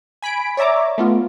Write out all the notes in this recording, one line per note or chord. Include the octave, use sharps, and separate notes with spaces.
G#5 B5 B6 D7
C#5 D5 E5 A#5 D6
A3 B3 F4